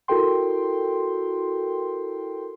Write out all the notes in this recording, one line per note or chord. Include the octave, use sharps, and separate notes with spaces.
E4 F#4 A4 A#4 G5 C6